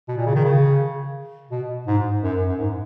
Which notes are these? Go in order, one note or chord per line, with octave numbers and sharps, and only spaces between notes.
B2
A#2
C#3
D#3
C#3
B2
G#2
F#2
F#2
G#2